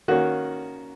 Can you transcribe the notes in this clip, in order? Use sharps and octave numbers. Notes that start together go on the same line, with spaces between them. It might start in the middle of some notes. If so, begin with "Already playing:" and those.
D#3 A#3 C#4 F#4